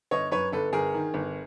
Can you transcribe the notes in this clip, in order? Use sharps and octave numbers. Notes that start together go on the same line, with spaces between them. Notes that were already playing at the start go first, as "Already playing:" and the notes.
G1 C#5 D#5
F#2 B4 C#5
G1 A4 B4
G1 G#4 A#4
D#3
G1